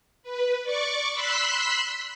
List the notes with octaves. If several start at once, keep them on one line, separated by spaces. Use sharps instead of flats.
B4
D5 C#6 D6
B5 C6 E6 F#6 B6